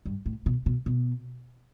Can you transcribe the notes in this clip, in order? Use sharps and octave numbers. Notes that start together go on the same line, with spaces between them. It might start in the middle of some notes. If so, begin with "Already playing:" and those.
G2
A2
B2
B2
B2